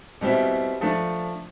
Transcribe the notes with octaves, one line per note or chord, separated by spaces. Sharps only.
B2 G3 C4 E4
F3 A3 D4